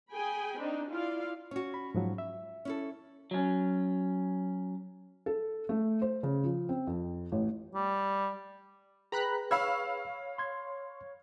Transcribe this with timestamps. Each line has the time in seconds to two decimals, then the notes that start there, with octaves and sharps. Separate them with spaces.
0.11 G#4 G5 G#5 B5
0.59 C4 D4 D#4
0.91 E4 F4 D5 F5
1.51 C#4 F#4 C#5
1.74 B5
1.95 G#2 F3 F#3
2.18 E5
2.65 C#4 E4 A4
3.31 F#3 C#4
5.26 A4
5.69 A3
6.02 C5
6.23 C#3
6.43 F3
6.69 C4
6.87 F2
7.32 A1
7.75 G3
9.12 G#4 B4 G5 A#5 B5 F#6
9.51 C#5 F5 B5 E6
10.38 C6 G#6